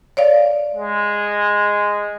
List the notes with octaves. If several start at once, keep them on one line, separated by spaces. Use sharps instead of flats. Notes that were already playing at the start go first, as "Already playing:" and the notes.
C#5 D5 F5
G#3